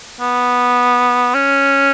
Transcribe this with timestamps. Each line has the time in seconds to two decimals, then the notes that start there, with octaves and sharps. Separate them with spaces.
0.21 B3
1.34 C#4